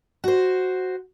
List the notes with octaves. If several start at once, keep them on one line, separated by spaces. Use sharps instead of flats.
F#4 C5